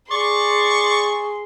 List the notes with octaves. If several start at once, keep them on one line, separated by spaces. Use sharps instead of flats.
G#4 D5 C6 C#6